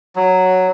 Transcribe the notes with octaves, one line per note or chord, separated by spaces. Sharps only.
F#3